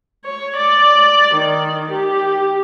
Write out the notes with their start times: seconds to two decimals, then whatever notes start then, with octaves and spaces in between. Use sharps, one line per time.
0.25 C#5
0.56 D5
1.34 D#3
1.91 G4